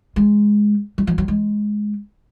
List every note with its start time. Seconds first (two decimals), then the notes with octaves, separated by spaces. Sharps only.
0.16 G#3
0.98 F#3
1.07 F3
1.18 F#3
1.28 G#3